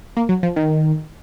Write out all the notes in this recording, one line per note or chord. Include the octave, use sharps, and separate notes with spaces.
A#3
F#3
F3
D#3